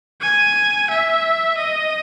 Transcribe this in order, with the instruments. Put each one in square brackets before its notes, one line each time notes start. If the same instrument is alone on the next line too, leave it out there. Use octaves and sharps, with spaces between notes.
[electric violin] G#5
E5
D#5